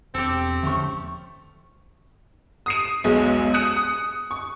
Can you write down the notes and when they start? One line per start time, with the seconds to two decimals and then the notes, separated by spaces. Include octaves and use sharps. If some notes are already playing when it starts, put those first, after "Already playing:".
0.15 E1 C4 G4 A4
0.63 E2 D3 F3 A3 C#4 C#6
2.66 D#6 C7 D#7
3.04 B1 E2 G#3
3.54 D#6 F#6 C#7 D#7
3.76 D#6
4.31 C#6